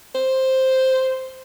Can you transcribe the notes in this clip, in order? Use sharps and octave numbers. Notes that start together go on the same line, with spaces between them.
C5